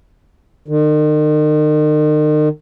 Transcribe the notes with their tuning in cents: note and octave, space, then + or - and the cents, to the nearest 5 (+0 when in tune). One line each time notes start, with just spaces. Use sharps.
D#3 -40